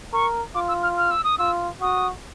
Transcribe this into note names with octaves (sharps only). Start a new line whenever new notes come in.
A#4 C#6
F4 D6
E6
F6
F6
E6
D#6
F4 E6
F#4 D#6